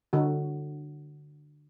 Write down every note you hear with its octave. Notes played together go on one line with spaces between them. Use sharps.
D3 F#4